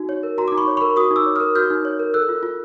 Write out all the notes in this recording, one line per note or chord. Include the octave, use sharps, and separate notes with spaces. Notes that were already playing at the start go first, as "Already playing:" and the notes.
Already playing: D#4 F#4
C#5
A#4
F#4 A#5 C6
D#4 D6
B5 C#6
C#5
B5 C#6
A#4
F#4 C#6 D#6
D#4
D6 E6
C#5
D#6 F6
A#4
F#4 F6 G6
D#4
C#5
A#4
A4 E6 F#6
F4
F4